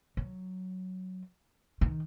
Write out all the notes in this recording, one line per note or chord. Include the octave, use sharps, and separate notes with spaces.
F#3
D#3